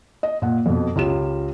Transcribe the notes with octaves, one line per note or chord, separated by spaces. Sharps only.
D#5
A#2 F#5
F2 B2
C#2 C#4 F4 G4 E7